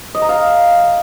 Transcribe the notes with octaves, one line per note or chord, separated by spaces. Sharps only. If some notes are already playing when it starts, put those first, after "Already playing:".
D#5
A#5
F5